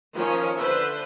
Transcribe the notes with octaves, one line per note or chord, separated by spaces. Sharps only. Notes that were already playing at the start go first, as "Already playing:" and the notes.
D#3 F3 C#4 C#5
D3 B4 C5 E5